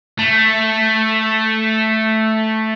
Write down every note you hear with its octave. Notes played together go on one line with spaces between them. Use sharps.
A3